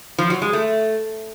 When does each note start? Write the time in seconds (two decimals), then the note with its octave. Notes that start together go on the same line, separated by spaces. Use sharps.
0.18 F3
0.30 F#3
0.42 G#3
0.53 A3